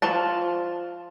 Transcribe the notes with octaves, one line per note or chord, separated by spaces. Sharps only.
F3 F4 A5